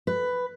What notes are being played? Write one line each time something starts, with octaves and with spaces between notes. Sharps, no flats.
B4